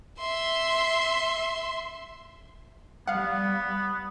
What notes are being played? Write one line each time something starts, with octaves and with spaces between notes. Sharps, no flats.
E5 C6
G3 B3 F5 F#5